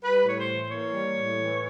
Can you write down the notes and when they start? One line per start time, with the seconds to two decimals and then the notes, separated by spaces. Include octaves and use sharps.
0.03 G3 B4
0.25 A2 C#5
0.37 C5
0.47 E3
0.70 A#3 C#5
0.92 G3
1.14 A2
1.36 E3